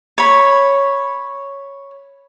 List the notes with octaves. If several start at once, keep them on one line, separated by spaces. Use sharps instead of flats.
C#5 B5